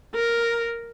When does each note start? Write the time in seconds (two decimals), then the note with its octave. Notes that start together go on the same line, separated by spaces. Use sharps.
0.15 A#4